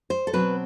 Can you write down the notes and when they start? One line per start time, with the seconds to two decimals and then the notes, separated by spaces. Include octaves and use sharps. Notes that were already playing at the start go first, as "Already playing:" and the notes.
0.10 C5
0.27 A4
0.33 B2 F#3 C4 B4